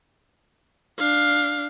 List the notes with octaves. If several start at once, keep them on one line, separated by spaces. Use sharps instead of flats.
D4 F5